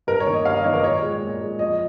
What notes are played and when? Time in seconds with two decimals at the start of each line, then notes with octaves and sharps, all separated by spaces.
0.07 G2 A#4
0.20 C#5
0.26 D#3 A#3
0.33 D#5
0.45 G2 F5
0.55 D#5
0.64 D#3 A#3 C#5
0.73 A#4
0.79 D#5
0.83 A#2 C#5
1.02 G#3
1.22 A#2
1.41 G#3
1.59 F2 D#5